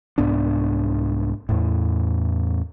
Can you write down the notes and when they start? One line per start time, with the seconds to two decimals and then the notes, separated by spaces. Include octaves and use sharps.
0.18 C2 G#2 B3 D4
1.49 E2 A2